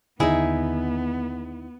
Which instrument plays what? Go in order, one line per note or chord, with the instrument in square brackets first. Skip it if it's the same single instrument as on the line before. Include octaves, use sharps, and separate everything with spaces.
[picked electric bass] D#2 D3 [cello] B3 [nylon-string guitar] D#4 E4 [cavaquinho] G#4 E5